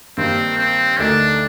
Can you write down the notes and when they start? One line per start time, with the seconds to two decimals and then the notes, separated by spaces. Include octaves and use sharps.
0.17 G2 D#3 A#3 C4
0.58 C4
0.99 D2 D3 A3 D4 D#4 A#4